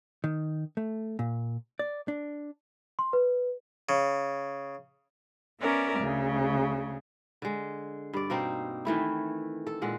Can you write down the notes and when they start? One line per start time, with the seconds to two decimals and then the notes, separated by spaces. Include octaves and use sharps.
0.24 D#3
0.77 A3
1.19 A#2
1.79 D5
2.08 D4
2.99 C6
3.13 B4
3.89 C#3
5.60 B3 C#4 A#4 D5 E5
5.97 D2 C#3
7.42 D3 G#3
8.14 G2 D5
8.30 B2 A#3 C4 D#4
8.85 D#3 E3 A3 E4
9.67 A4
9.82 A#2 G#3 F#5